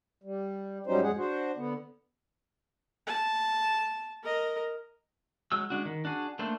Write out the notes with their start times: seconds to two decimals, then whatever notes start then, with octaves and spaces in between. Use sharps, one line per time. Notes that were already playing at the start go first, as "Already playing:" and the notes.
0.24 G3
0.87 G#2 F#3 G3 C#4 D#4 C5
1.03 F2 A2 G#3 G#4 F#5
1.17 D4 F#4 C5
1.56 D3 B3
3.07 A5
4.23 A#4 D#5
5.52 F#3 G#3 E6
5.70 G#3 D4 F#4
5.85 D#3
6.05 D4 F#4 G#4
6.39 A3 A#3 D4 C5